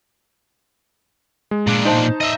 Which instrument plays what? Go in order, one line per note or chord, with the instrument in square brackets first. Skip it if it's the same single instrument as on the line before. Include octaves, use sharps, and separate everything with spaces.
[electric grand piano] G#3
[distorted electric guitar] A#2 D4
[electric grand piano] D#4 C5 A5
[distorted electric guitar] D#5 E5